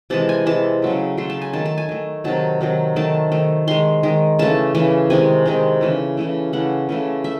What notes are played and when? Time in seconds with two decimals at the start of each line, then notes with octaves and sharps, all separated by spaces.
0.10 C3 E3 G#3 A5
0.29 G#5
0.46 C3 E3 G#3 A5
0.82 C#3 F#3 A3
1.17 C#3 F#3 A3 C6
1.30 A5
1.42 G#5
1.53 D#3 A3 A5
1.65 A5
1.78 G#5
1.89 D#3 A3
2.24 C3 D#3 F#3 A5
2.61 C3 D#3 F#3
2.96 D#3 A3 A5
3.32 D#3 A3
3.68 D#3 G#3 C6
4.03 D#3 G#3
4.39 C#3 E3 A3 A5
4.75 C#3 E3 A3
5.10 C3 D#3 G#3 G#5
5.46 C3 D#3 G#3
5.81 C#3 E3 A3
6.17 C#3 E3 A3
6.53 C#3 E3 A3 F#5
6.89 C#3 E3 A3
7.24 A3 E5